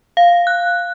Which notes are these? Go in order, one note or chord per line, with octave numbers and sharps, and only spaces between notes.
F5
F#6